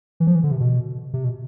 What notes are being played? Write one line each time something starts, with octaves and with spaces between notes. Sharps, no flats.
E3
F3
E3
D3
C3
B2
C3
B2